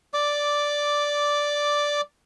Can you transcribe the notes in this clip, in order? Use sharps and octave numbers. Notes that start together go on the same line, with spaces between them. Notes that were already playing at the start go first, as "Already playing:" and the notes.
D5 D6